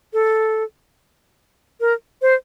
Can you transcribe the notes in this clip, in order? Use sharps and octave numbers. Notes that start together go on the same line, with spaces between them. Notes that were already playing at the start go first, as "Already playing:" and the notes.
A4
A#4
C5